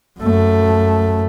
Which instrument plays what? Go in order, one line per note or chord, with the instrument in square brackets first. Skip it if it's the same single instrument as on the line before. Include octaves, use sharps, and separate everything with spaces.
[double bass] F#2 A3